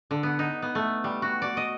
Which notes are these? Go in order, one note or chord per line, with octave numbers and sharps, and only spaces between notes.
D3
B3
D#4
B3
A3
G3
F#4
D5
D#5